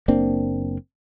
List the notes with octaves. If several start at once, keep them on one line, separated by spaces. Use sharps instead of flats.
F#1 A#3 C4 D4